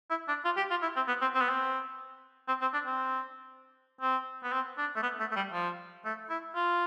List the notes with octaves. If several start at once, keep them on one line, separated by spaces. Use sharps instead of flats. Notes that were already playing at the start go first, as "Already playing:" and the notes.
E4
D4
F4
G4
F4
E4
C4
B3
C4
C4
B3
C4
C4
C4
D4
C4
C4
B3
C4
D4
A3
B3
A3
A3
G3
F3
A3
E4
F4